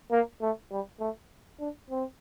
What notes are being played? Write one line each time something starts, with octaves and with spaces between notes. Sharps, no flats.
A#3
A3
G3
A3
D4
C4